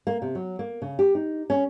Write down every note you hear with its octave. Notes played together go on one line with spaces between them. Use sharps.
A#3
C3
F#3
A#3
C#3
G4
D#4
C#4